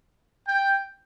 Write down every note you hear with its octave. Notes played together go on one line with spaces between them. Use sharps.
G5